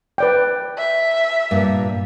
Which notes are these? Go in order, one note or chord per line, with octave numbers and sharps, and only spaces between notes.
B4 D5 G5
E5
G2 A#2